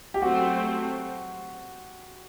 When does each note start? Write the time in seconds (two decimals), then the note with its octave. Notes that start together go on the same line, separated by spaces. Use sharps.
0.14 G4
0.22 F#3 A3 C4 F#4